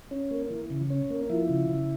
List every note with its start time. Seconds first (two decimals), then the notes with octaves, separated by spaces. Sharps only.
0.11 C#4
0.31 A#3
0.50 E3
0.70 C#3
0.90 C#4
1.10 A#3
1.30 F3 E4
1.49 C#3
1.69 C#3